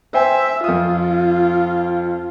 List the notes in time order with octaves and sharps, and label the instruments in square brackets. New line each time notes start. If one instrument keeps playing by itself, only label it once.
[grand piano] C5 G5 G#5 [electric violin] E5
[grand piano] F2 D#6 [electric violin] F4